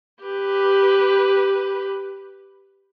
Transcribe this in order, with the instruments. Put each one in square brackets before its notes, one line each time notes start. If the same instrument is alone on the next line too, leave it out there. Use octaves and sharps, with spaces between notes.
[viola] G4 B4